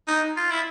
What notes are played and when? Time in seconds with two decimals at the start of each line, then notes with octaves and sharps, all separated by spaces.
0.08 D#4
0.37 F4
0.51 E4